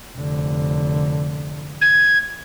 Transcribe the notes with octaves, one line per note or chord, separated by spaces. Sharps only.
F1 D3
G#6